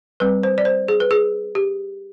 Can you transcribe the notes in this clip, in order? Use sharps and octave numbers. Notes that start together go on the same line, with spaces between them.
G3 C4 B4
C5
D5
C5
G#4
B4
G#4
G4